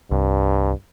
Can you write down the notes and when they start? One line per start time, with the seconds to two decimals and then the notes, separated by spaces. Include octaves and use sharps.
0.11 C2 G2